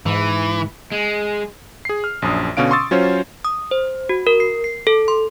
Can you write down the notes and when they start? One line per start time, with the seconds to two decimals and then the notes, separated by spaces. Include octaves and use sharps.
0.06 G#2 E3
0.92 G#3
1.85 G#4 C7
2.04 F6
2.22 A#1 F#2 D4 D#6
2.57 B2 D3 C#4 F5 D7
2.71 C6 C#6 D#6 E6 A6
2.91 F#3 C#4 F4 C5 C#5
3.45 D#6
3.71 C5
4.09 F#4
4.27 A#4
4.40 C7
4.64 C7
4.87 A4
5.08 C6